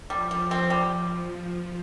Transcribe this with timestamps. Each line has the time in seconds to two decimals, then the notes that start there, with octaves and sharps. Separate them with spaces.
0.10 F3 G3
0.31 G3
0.51 F3 C4
0.70 G3